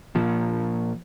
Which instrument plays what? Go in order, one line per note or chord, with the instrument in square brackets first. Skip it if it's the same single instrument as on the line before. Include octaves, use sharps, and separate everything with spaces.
[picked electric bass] A#2 F3